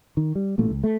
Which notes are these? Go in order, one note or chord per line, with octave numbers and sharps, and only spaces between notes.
D#3
G3
A1 A#2 A3
C#2
A3